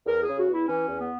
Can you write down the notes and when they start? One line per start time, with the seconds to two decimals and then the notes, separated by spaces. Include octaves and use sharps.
0.06 E2 A#4
0.22 C#3 G#4
0.37 F#4
0.46 E2
0.52 E4
0.67 E3 C#4
0.87 E2
0.98 B3